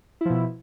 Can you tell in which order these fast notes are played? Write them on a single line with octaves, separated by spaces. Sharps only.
E4 F3 B2